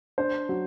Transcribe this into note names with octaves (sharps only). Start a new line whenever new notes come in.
D4 C5
F#3